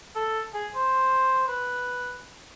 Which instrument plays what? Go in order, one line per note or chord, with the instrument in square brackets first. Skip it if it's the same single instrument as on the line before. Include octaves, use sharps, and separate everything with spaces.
[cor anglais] A4
G#4
C5
B4